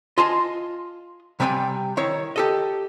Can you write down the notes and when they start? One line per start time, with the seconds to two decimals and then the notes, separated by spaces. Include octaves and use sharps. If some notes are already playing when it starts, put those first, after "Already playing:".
0.18 F4 D#5 G#5 A5 C6
1.40 C3 G3 D5 E5 G5 G#5
1.97 D#3 E4 C#5
2.36 G4 A4 D#5